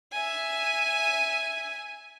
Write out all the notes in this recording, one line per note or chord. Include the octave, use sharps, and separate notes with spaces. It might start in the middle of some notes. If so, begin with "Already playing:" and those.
E5 G#5